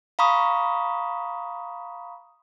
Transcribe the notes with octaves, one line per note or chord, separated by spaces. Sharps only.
F5 A#5 B5 C#6 D#6